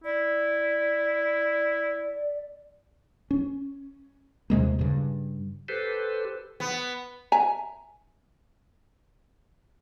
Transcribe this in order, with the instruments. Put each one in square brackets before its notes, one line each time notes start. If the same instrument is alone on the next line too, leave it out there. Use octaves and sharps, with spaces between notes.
[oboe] E4 [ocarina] D5
[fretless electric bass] C#4
D#2 C3 G#3 A#3
G2 C#3
[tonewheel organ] G4 A4 B4 C5
[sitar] B3
[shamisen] E5 G#5 A#5